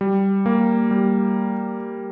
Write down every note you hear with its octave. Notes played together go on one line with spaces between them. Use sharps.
G3
A#3
G3